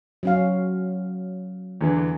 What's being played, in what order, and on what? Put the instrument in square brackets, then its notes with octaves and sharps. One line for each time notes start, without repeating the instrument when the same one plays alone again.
[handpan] F#3 C#4 F5
[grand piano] E2 D3 E3